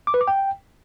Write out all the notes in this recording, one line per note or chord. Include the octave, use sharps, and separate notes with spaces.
D6
B4
D6
G5